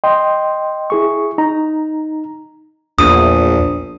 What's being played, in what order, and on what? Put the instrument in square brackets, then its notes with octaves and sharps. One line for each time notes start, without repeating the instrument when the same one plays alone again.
[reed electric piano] D#5 G5 C6
E4 G#4 C#6
D#4 A#5
[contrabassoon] A#1 [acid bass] E2 [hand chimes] D#6